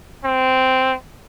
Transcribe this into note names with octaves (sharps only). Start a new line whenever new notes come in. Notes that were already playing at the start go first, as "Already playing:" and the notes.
C4